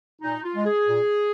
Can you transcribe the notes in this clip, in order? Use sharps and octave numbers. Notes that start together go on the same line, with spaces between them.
A#2 D#4
F4
G#3
G#4
A#2